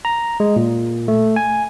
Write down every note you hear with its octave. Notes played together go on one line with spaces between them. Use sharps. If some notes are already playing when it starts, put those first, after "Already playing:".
A#5
G#3
A#2
A3
G#5